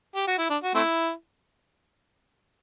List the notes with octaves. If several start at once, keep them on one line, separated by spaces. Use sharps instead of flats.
G4
F#4
E4
D4
F#4
A3 C4 E4